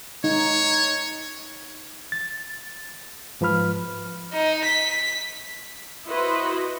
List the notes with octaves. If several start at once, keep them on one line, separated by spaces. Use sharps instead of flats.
D#4 C#5
A6
G#2 F3 B4 B5 F6
D#4
B6
E4 F#4 B4 C5 D#5